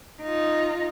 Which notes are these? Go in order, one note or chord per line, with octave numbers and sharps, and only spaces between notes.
D#4 F4